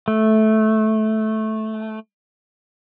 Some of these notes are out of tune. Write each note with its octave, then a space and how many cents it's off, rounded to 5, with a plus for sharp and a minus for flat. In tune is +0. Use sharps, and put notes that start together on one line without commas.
A3 -10